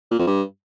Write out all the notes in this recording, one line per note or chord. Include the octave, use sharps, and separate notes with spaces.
A#2
F2
G2